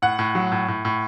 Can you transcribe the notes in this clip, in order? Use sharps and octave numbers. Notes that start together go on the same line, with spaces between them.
A2 F#5
A2
F#3
A2
A2
A2